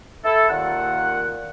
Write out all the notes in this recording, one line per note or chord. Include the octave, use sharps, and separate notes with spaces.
E4 A4
D#2 A#2 D#3 F#5